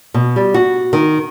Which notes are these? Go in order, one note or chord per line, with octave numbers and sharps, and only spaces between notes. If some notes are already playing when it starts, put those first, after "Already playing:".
B2
G3
F#4
D#3